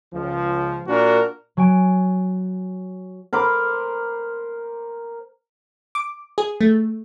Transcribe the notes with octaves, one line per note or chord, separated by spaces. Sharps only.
C#2 F3
A#2 D4 F#4 A#4
F#3 G#5 D7
A#4 C5 B5 D6
D6
G#4
A3